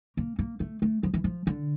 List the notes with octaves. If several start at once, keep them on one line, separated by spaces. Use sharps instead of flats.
A#3
A#3
A3
A3
F3
E3
F3
D3